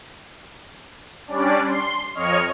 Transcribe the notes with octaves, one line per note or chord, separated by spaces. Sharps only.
G3 C#4 D4 D5
C6
F2 C#5 D#5 C#6 F6